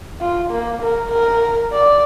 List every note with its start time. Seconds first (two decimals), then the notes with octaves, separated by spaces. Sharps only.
0.21 F4
0.51 A#3
0.82 A#4
1.12 A#4
1.73 D5